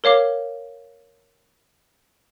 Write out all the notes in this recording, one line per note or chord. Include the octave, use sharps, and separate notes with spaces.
A#4 C#5 F5 D6